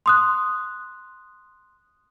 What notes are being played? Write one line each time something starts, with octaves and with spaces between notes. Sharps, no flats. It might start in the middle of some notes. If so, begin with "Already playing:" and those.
C6 D#6 F#6